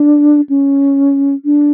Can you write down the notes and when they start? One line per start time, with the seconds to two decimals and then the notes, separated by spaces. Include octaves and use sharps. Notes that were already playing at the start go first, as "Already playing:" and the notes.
Already playing: D4
0.49 C#4
1.45 D4